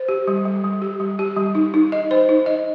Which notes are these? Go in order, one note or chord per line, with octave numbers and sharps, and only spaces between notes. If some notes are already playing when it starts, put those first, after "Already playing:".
Already playing: C5
G4
G3
G3
G3
G4
G3
G4
G3
D#4
D#4
D#5
C5
D#4
D#5